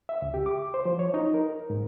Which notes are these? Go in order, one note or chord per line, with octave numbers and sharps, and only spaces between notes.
E5
C#2
G4
D6
C5
F3
C#5
D#4
A#4
G#2